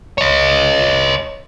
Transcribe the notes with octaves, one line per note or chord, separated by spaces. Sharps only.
C#5 D#5